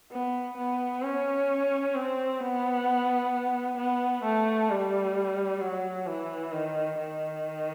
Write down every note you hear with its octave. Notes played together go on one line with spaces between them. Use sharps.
B3
B3
C#4
C4
B3
B3
A3
G3
F#3
E3
D#3
D#3